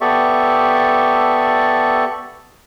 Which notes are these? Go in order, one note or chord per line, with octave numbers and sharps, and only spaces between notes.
B3 G4 A4 D5 E5 C#6